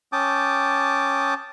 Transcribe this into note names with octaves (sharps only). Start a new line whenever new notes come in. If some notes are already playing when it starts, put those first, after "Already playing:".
C#4 G5 A5 D6 D#6